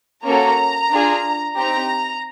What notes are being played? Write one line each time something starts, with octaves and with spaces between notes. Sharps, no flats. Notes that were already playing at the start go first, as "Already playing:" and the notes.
A#3 C#4 F#4 A4 A#5
D4 F4 G#4
C4 D#4 G4 A#5